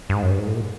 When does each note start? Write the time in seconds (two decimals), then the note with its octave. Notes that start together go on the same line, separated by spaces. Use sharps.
0.09 G2
0.14 G#2
0.23 F#2
0.31 G2
0.39 G#2
0.47 A2
0.55 A#2